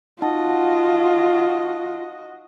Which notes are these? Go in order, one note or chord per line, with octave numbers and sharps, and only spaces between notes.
D#4 F4 F#4 D#5 F#5 A5